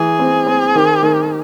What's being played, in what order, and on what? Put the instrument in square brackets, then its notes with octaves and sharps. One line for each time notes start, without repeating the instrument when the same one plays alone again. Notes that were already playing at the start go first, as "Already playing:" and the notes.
Already playing: [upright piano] E3 [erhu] G#4
[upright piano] C4
C4
D#3
D#3